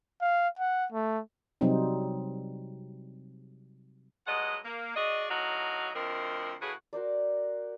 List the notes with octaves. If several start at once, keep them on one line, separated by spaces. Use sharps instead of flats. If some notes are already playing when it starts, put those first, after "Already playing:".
F5
F#5
A3
C3 F#3 G3 C4 D#4
G2 F#3 G#3 D#5 F#5
A#3
F#4 G#4 D5 D#5
A2 F#3 D#4 F#4 F5
D2 F3 C4 A#4 D#5
A2 C#3 F#4 G#4 B4
F#4 A#4 C5 D5